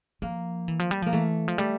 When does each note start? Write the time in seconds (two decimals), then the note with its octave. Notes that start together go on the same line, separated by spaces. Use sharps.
0.22 F3 A#3
0.68 E3
0.79 F3
0.91 G3
1.02 F3 A#3
1.13 E3 A3
1.48 F3
1.58 G3 A3